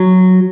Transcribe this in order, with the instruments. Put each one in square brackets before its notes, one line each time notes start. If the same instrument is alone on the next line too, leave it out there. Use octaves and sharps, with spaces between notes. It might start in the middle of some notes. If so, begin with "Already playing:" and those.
Already playing: [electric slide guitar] F#3